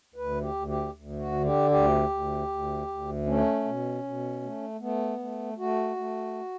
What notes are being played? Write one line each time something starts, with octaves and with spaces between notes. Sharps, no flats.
D2 B4
G4
D2
G4
D2
F#4
D3
G4
D2 G4
D2
D2
D2
A3 C#4
B2
B2
A3
A3 B3
A3
A3 F#4
A3